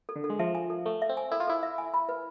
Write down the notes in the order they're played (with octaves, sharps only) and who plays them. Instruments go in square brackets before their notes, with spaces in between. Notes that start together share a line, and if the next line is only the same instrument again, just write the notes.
[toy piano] A4
[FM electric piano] D3
[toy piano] A4
[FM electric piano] G#3
[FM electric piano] F3 [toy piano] E5
[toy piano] G#5
A4
[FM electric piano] A3 [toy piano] A4
[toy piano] E5
[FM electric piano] C4
[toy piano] G#5
[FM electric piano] E4 [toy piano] A4
[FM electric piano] F4
[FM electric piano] E4 [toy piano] A4
[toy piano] E5
G#5
B5
B4